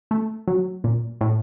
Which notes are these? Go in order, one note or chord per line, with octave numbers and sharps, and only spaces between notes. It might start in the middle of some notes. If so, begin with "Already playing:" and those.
A3
F#3
A#2
A2